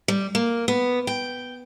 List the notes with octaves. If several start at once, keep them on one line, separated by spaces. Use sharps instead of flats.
G3
A#3
B3
G5